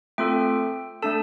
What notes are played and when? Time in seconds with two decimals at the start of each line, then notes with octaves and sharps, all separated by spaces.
0.18 A3 C4 F4 A4 G5
1.02 A3 D4 A4 A5